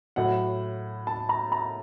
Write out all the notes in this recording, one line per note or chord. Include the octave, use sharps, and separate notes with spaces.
A2 F#3 F#5
A5
A#5
A#5